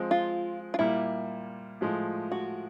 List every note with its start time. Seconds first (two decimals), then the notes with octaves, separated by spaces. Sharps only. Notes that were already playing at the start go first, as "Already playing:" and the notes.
Already playing: F3 G#3 C4
0.11 F4
0.74 F4
0.79 A#2 G3 A#3 E4
1.81 A2 F3 G#3
2.32 F#4